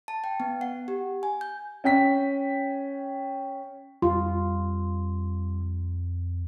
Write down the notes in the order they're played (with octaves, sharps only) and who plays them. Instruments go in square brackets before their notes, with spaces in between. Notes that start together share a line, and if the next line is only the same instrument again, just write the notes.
[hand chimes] A5
G5
B3
F#5
G4
G#5
G6
[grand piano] C#4 G5 B6
[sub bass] F2 [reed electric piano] G3 C6 [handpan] F4